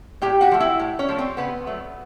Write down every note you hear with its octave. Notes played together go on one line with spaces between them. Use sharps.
A2 G4 G5
F#4 F#5
F3 A3
E4 E5
A2
C#4 C#5
F3 A3
C4 C5
C#3 B3 B4
F#3 A3